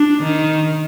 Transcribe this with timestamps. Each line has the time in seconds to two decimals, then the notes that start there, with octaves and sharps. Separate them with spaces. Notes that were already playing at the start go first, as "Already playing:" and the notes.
Already playing: D4
0.23 D#3